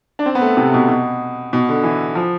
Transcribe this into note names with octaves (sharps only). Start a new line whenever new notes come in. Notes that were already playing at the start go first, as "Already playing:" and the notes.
D4
C4
B3
A3
C3
B2
B2
B2
D3
E3
F3